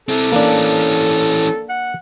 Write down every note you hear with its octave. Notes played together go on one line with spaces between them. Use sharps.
C4 E4 A4
E3 A#3 C#4 D4
F#5